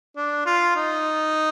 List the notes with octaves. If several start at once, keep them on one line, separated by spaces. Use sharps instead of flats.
D4
F4
D#4